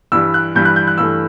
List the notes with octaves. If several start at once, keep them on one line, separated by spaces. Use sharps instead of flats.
G2 E3 G3 E6
F#6
G2 E3 G3 G6
F#6
G6
F#6
G2 E3 A3 E6